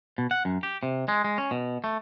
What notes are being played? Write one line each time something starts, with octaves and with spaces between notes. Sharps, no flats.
B2
F#5
F#2
G4
C3
G#3
G#3
C#4
B2
A3